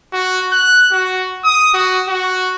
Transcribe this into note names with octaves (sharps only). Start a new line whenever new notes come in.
F#4
F#6
F#4
D#6
F#4
F#4